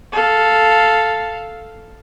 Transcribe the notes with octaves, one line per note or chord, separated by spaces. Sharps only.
A4 F5